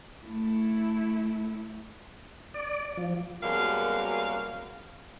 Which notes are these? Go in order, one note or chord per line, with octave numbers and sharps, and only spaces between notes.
A3 E4
D5
F3
F#2 B2 G3 G#3 A#3 F5